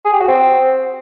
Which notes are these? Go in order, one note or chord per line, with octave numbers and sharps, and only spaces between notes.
G#4
G4
F#4
C4